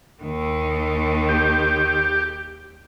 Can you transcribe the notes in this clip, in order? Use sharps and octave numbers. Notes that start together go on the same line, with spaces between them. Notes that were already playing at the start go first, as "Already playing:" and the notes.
D#2 D#3
G4